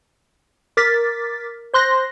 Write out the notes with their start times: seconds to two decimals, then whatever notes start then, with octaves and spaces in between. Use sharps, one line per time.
0.77 A#4 D6 A6 B6
1.74 C5 C6 F#6 A#6